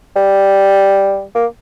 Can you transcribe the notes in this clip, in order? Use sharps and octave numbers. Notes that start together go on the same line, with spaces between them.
G3
A#3